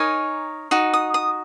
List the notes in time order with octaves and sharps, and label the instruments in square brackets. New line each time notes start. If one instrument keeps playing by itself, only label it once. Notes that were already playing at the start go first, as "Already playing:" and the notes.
Already playing: [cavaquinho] D#4 A#4 C#5 G#5
D#4 F#4
D#6
D#6